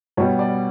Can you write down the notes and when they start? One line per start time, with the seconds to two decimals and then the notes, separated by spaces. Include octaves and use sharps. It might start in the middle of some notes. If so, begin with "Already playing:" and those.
0.17 B2 G3 B3 C#5
0.39 D5